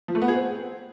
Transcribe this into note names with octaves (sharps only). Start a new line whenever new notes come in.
F3
A3
B3
G#4
C4